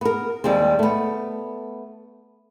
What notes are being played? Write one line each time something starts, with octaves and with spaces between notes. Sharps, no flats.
B3 A#4
D#2 G3 G#3 C4
A3 B3